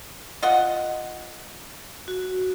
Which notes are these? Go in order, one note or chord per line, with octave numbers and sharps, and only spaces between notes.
F4 D#5 F#5
F#4